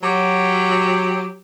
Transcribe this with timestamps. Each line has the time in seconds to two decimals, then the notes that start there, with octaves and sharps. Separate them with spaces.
0.03 F#3 G4